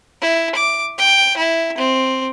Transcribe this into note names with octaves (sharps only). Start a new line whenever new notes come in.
E4
D6
G5
E4
C4